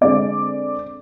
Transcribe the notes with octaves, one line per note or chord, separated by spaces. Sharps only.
D3 G#3 C4 D5